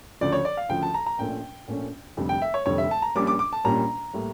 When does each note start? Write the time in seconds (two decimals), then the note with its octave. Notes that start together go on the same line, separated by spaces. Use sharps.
0.21 D2 C#3 F3 D5
0.32 C#5
0.45 D5
0.57 F5
0.69 D2 C#3 F3 G5
0.83 A5
0.94 A#5
1.06 A#5
1.18 A#1 A#2 A3 C#4 G5
1.68 A#1 A#2 A3 C#4
2.17 F1 F2 D3 G3
2.29 G5
2.42 E5
2.54 C#5
2.66 F1 F2 D3 G3 C#5
2.78 E5
2.91 A5
3.02 A#5
3.15 A#1 A#2 G3 C#4 D6
3.27 D6
3.39 D6
3.53 A5
3.64 A#1 A#2 G3 C#4 A#5
4.13 A2 G3 A#3